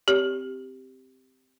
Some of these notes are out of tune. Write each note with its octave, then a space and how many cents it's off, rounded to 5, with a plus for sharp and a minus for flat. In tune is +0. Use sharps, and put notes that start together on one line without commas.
C4 -10 G4 +0 C#5 +40